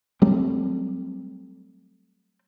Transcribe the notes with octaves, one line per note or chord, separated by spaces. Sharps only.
F#3 G3 A3 C4